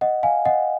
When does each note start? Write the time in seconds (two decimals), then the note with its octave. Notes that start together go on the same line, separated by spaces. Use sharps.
0.01 D#5 F#5
0.23 F5 G#5
0.45 D#5 F#5